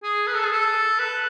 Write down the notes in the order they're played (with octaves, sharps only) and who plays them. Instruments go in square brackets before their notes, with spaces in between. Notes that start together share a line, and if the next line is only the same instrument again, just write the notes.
[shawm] G#4
B4
A4
G#4
A4
B4